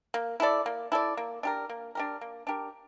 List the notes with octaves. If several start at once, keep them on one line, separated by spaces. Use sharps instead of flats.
A#3
E4 A4 D5
A#3
E4 A4 D5
A#3
D4 G4 A#4
A#3
D4 G4 A#4
A#3
D4 G4 A#4